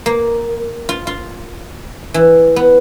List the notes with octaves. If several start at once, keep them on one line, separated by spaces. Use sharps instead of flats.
A#3
F4
F4
E3
B3